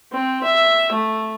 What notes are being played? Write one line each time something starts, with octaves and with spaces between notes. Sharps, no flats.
C4
E5
A3